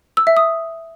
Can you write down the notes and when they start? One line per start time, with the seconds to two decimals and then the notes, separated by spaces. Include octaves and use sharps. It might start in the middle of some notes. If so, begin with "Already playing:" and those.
0.17 E6
0.27 E5
0.37 D#6